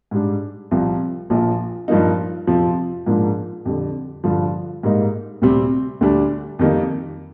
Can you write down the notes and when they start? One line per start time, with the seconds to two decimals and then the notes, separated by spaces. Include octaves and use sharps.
0.11 G#2 G3 D4
0.71 C2 C3 F3
1.30 A#1 A#2 F3
1.88 G2 F3 A#3 D#4
2.47 F2 C3 F3 C4
3.06 G#2 F3 A#3 D4
3.65 F2 D3 G3
4.24 G2 D3 F3
4.83 G#2 G3 A#3 D#4
5.42 D2 C3 G3 C4
6.01 D2 D3 G3 D4
6.59 F2 D#3 G3 A#3 D#4